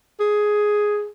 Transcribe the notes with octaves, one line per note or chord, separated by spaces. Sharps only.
G#4